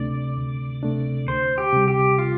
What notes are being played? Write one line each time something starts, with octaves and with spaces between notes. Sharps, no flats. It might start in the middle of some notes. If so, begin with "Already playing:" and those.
Already playing: D2 C3 A3 D4 D5
D2
C3 A3 D4
D2 C5
G4
C3 G3
G4
F4